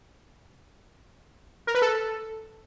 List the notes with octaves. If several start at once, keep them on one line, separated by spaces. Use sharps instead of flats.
A#4
B4
A4